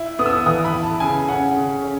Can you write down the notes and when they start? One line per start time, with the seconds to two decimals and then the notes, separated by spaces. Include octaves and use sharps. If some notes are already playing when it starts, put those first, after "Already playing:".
Already playing: E4
0.19 B3 D#6
0.26 E6
0.33 D#6
0.46 E3 D#6
0.65 B5
0.73 E4
0.82 A5
1.00 C#3 G#5
1.28 C#4 F#5
1.56 C#3
1.82 C#4